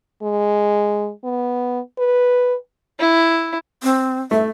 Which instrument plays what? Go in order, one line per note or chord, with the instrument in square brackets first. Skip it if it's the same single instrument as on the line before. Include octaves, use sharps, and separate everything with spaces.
[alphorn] G#3
B3
B4
[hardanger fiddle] E4
[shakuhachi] C4
[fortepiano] A3 [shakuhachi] E5